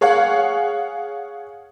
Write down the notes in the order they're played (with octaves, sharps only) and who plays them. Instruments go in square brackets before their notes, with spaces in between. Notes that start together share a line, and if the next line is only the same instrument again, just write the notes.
[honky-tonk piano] G#4 C#5 F5 F#5